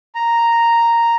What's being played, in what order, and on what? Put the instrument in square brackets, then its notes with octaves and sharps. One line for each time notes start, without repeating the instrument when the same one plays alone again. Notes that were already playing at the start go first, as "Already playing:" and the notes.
[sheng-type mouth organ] A#5